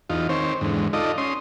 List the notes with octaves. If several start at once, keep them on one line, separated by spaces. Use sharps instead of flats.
E2 D#4 F4
D#3 C4 C5 C#5
E2 G#2 D3
D#4 F4 A4 D5 D#5
C#4 C6 D#6